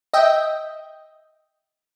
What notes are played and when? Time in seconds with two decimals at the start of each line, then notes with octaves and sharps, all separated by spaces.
0.13 D#5 E5 G5